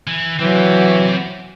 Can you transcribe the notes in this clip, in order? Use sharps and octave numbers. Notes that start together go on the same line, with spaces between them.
E3
E3 F#3 C4 G4